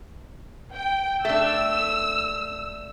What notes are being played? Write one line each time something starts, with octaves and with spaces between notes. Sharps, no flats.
G5
A3 D4 E6